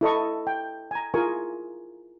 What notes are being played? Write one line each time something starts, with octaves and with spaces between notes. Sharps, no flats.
E4 A4 D#5 C#6
G5
G#5 A#5
E4 F4 G#4 A#4 G#5 C#6